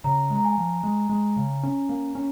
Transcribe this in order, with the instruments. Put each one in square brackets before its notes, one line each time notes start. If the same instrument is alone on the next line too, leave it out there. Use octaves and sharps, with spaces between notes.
[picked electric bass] C#3 [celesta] A#5
[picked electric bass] G#3
[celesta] A#5
G#5
[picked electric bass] F3
G#3
G#3
C#3
C#4
A#3
C#4